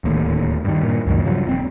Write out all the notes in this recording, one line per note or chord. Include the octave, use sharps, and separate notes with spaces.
D1 D#2 A2
G2 D#3
G2 A#2
C#2 F#2 A#2 D#3
G2 C#3 F3 F#3
D#1 C4